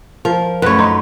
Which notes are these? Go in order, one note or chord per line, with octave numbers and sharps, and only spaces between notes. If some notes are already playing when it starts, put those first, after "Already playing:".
F3 A#4
F#2 A3 B4 C#5
D#4 C6